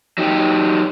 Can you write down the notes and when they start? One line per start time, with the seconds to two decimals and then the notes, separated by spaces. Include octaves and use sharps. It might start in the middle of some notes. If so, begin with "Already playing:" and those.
0.18 F#3 D#4 G4